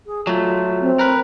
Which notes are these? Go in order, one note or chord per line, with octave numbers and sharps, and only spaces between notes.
G#4
F#3 A3 F4
C4
A#4 B4